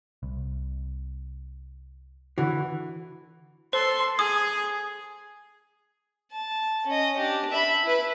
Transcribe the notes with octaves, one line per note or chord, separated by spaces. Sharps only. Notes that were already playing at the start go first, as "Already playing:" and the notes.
C2
D3 E3 F#4
A4 C5 C6
G#4 G#5 D#6
A5
C#4 D#5
D4 G4
E5 B5
E4 B4